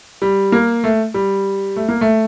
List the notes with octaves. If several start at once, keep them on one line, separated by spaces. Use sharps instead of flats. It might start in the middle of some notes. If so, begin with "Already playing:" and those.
G3
A#3
A3
G3
A3
A#3
A3